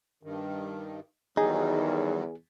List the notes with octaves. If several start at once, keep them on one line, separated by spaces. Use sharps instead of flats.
G2 D#3
E2 D#3 F#3 G3 D#4 G#4